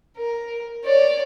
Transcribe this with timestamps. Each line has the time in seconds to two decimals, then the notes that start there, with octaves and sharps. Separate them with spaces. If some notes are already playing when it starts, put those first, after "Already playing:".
0.17 A#4
0.84 C#5 D5